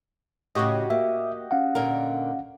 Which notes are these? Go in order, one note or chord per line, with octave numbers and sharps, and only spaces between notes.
A2 C#3 F#4 G4 D#5
A#3 E5
C#4 F5 F#5
A#2 D3 A#4